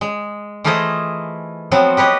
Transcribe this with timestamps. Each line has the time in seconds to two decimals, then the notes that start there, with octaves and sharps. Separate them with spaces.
0.01 G#3
0.64 E3 A3 F4 G#4 C5 D#5
1.71 F3 F#3 B3 C4 F#4
1.97 G4 B4 C#5 D#5